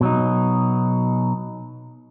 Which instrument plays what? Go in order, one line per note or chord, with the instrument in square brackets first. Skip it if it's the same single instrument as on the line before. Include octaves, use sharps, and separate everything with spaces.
[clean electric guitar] B2 F#3 D#4